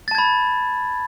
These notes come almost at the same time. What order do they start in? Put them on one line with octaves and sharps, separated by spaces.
A6 A5 G#6 B5